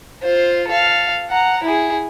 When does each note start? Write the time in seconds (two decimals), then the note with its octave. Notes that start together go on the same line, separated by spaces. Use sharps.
0.22 F4 C5
0.68 A4 F5
1.30 F#5 A#5
1.63 E4 G#4